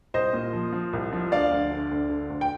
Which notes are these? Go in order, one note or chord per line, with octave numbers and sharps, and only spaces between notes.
C2 C5 D#5
A#2
F3
F3
C2
F3
D2 D5 F5
D2
D3
D2
D3
D2
G5